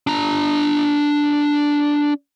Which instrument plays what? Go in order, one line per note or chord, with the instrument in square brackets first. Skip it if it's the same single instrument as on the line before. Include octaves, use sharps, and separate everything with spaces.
[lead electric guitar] D4 A#5